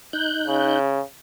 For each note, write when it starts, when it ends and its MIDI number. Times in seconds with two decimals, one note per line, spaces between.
0.13 0.79 63
0.13 0.79 90
0.13 0.79 91
0.47 1.02 49